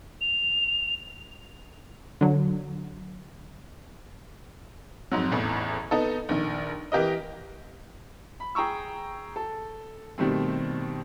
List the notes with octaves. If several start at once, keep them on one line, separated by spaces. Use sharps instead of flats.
F7
D3 F#3
F2 G#2 F#3
A1 E2 A2
B3 D#4 A4
A#1 D#3
E3 G4 A#4 D#5
B5
G#4 G5 A#5 C#6 E6
A4
B2 D#3 G3 A3 C4